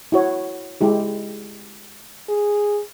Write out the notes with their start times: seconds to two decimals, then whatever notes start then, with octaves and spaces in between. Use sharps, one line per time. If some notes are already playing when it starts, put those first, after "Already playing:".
0.12 E4 F#4 C#5
0.81 G#3 E4 G4
2.29 G#4